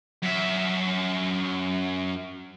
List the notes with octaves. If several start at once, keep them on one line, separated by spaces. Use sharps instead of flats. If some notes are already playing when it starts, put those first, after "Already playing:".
F#2 E5